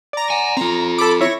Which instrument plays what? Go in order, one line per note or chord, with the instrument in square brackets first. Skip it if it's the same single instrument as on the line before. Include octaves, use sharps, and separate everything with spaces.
[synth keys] D5 A#5
[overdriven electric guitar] F#5 G#5
[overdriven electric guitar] C4 F4 [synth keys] A#5
[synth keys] A4 B5 D6
E4 C#5 A#6